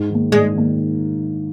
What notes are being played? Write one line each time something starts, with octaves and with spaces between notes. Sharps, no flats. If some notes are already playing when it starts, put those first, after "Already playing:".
Already playing: G#2
D#3 A#3
G#2 G#3
D#3 A#3